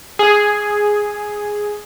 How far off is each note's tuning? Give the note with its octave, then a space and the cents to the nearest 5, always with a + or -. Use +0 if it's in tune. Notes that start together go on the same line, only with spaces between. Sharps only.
G#4 +0